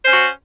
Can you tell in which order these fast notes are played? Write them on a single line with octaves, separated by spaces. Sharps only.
C5 C#4 F#4